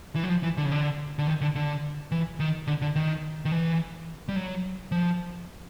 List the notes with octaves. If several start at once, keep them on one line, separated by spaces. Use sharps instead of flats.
E3
F#3
F3
E3
D3
C#3
D3
D3
D#3
D3
D3
E3
D#3
D3
D3
D#3
D#3
E3
G3
F#3
F3